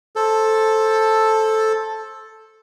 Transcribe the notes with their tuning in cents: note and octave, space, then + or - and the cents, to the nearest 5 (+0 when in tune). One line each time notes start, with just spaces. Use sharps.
A4 +0 C5 +20